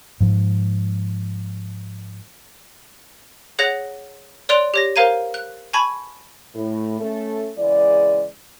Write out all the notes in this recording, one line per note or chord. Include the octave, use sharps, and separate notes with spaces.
G#2 F3
G#4 C#5 F#5 F#6 A#6 F7
C#5 D5 C6 F#6 D7 F7
G4 C#5 A#6
A#4 C5 F5 A#5 G#6 D#7
F#6
G#5 A5 B5 C#6 G#6
A2
A3 C#4 A4
C#3 E3 G#3 D5